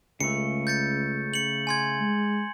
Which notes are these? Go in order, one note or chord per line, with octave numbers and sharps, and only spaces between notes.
C#2 C#3 A3 C#7
G6 A6 C#7
C#7 F#7
G#5 C6 G#6
G#3